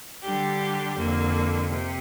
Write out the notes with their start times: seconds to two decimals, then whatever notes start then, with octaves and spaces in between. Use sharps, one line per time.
0.21 D3 G3 D4 G4
0.95 F2 D3 A#3
1.70 C3